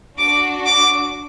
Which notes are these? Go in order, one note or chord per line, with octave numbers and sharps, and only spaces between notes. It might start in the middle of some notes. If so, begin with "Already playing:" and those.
D4 F#4 D6
D6